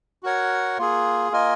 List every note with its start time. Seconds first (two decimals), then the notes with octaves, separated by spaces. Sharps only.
0.23 F#4 A#4 C#5 F#5
0.78 A#3 F4 G#4
1.32 A#3 F4 A#4 D#5 G#5